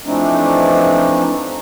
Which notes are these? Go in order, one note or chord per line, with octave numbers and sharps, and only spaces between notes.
E3 F3 A3 C4 D4 D#4